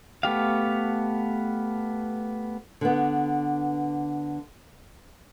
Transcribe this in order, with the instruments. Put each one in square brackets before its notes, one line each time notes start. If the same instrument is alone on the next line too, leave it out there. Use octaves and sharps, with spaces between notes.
[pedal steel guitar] A3 B3 G4 F5
[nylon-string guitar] D3 B3